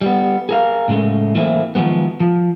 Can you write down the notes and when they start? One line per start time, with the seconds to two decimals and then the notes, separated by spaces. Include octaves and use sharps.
0.01 G3 B3
0.49 G#4 A#4 F5
0.88 A2 C#3 F#3 G#3 A3
1.35 E3 F#3 A3 A#3 C4 E4
1.75 D#3 F3 F#3 G#3 B3
2.20 F3